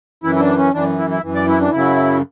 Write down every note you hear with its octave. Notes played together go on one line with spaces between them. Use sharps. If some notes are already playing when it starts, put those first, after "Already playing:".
F#2 E3 E4
E4
D4
C#4
F#2 E3 D4
E4
E4
F#2 E3
D5
E4
D4
F#2 C#3 F#3 E4